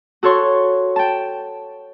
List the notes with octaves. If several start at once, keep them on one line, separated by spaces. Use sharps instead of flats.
F#4 A4 C#5 C6 C#6
G5 A5